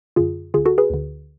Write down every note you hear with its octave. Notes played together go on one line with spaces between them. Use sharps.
F#2 D3 F4 G#4
D2 D3 F4 G#4
F#4 A4
G#4 B4
D2 D3